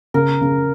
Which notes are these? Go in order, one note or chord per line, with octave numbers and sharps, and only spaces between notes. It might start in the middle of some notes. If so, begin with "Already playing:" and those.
C#3 A#4
C#3